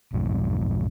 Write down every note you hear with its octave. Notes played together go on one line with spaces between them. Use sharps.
B1 F2 G#2